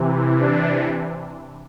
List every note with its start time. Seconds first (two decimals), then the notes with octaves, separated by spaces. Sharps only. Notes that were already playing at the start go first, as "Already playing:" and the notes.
Already playing: C3 E3
0.40 D4